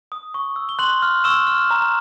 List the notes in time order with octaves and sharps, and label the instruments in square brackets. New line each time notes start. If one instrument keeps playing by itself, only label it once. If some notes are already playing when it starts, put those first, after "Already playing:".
[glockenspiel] D#6
C#6
E6
G7
C6 F#6 F#7
F6
C#6 E6 E7
F6
A#5